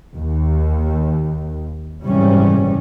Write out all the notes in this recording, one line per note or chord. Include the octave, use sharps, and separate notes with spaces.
D#2
F#1 G#2 C3 E3 G3 C#4